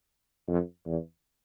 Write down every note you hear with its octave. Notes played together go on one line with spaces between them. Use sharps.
F2
E2